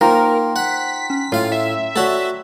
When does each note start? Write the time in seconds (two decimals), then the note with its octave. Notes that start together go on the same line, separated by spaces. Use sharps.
0.01 A#3 D#4 F4 A#4 C5 G5 A#5 C6
0.56 F#5 B6
1.10 C#4
1.32 A2 F4 F5
1.52 E5
1.96 A3 F#4 A4 C#5 D5